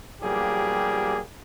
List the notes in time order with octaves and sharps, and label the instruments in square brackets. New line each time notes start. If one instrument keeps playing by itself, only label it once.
[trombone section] B1 F3 G3 A#3 G4 G#4